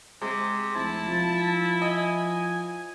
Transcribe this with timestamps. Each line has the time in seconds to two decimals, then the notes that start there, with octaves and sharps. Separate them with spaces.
0.21 C3 G#3
0.75 F1 E4 A5
1.07 F3
1.82 D#5 G#5